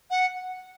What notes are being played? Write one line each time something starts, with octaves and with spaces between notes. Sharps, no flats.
F#5